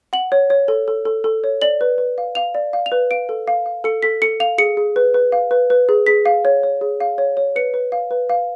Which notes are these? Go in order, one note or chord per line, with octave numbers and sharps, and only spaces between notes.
F#5 F#7
C#5
C#5
A4
A4
A4
A4
C#5
D5 F#7
B4
B4
F5
F5 F7
D5
F5
F7
B4
F5 D7
A4
F5
F5
A4 C#7
A4 B6
A4 C#7
F5 F7
G#4 C#7
G#4
B4
B4
F5
B4
B4
G#4
G#4 B6
F5
C#5
C#5
G#4
F5
C#5
C#5
B4 C#7
B4
F5
B4
F5